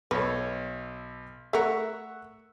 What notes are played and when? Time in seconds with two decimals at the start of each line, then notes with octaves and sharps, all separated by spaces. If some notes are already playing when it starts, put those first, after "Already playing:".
0.11 B1 A4 B4 C#5
1.53 A3 A#4 E5 F#5 C#6